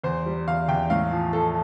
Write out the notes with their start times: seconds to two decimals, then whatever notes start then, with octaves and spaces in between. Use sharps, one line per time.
0.04 E2 C5
0.26 G3
0.47 E2 F5
0.68 E2 G5
0.90 A2 F5
1.11 F3
1.33 F3 A4